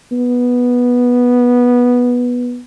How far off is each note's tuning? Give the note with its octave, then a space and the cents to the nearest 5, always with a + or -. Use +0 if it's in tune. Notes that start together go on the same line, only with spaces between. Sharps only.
B3 -10